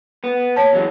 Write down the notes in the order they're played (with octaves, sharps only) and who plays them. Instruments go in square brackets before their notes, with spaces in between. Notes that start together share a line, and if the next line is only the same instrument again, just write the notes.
[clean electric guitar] B3
[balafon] C#5 A5
[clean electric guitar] E2 F#3 G#3